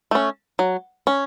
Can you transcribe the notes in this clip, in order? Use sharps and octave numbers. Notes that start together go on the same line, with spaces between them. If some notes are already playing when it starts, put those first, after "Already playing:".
A3 C#4
F#3
C#4